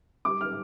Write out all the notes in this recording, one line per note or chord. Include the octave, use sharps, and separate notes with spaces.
G3 D6
F6